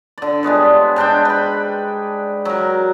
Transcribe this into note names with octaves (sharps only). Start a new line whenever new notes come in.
D3 D5
G3 G#3 B3 C#5
G#2 D4 C5 G5
B4 B5
F#3 A#4